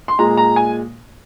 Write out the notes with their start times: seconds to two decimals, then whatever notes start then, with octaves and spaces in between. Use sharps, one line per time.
0.08 C6
0.19 A#2 G#3 A#5
0.37 A#5
0.56 G#5